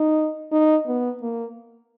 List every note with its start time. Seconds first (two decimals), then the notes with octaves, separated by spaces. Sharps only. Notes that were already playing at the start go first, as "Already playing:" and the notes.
Already playing: D#4
0.52 D#4
0.87 B3
1.22 A#3